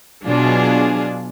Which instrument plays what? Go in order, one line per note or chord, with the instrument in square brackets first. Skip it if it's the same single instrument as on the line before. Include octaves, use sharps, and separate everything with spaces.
[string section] B2 F#3 D4 F4 G#4